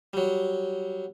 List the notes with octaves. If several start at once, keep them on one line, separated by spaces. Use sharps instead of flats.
F#3 G3